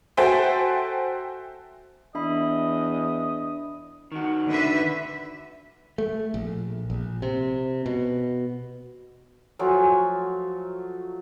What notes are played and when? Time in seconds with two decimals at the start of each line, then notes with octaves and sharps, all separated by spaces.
0.17 F#4 A4 C5 E5 G5 G#5
2.15 E2 D4 D#5 E5 B5
4.12 D#3 F#4
4.49 D3 B4 E5
5.98 A3
6.34 A#1
6.90 A#1
7.22 C3
7.86 B2
9.59 F3 F#3 A3 G#5